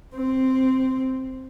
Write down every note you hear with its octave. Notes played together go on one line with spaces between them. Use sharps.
C4